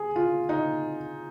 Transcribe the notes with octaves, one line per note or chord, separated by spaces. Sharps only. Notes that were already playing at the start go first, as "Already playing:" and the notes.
Already playing: G#4
F4
D#4